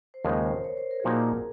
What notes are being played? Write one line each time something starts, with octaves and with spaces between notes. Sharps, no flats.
C5
D#2 C#3 F3 G#3 D#4 A#4
C5
C#5
C5
A#4
G#4
A#2 F3 A#3 D#4 F#4 A#4